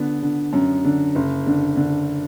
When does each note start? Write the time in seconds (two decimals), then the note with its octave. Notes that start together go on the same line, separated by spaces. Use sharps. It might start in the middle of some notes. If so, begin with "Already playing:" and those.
Already playing: D3 B3
0.22 D3
0.53 F#2
0.84 D3
1.15 F#1
1.46 D3
1.76 D3